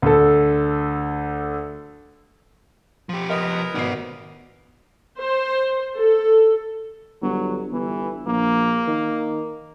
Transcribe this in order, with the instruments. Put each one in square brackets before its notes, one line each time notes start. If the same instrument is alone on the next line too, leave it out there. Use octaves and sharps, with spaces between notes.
[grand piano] D2 A4
[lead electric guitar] F3 G4
[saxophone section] B3 G#4 A#4 [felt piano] D#5
[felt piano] G#1 B2 C7 [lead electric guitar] F#4 D5
[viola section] C5
A4
[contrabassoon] G1 [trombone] F#3
[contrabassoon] G1 [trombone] E3
[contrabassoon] A#1 [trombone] A#3
[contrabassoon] D#3